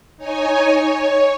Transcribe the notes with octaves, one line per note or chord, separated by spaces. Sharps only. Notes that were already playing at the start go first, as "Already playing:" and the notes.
D#4 C#5 G#5
C#5